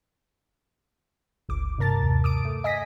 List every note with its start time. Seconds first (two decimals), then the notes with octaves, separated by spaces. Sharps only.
1.49 G1 C#2 D6
1.78 G2 C3 A#4 A5 A6
2.03 D#2
2.24 D6 D#6 D7
2.45 A3
2.64 D#5 G#5 D#6 A#6 B6